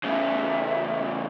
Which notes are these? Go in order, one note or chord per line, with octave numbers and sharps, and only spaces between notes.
E2 C#3 E5